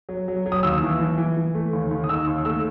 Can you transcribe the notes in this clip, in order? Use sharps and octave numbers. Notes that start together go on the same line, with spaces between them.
F#3
F#3
F#3
D#6
D#2 E6
E3
E3
E3
E3
A3
D#2
D#2
D#6
D#4 E6
D#2
A3 E6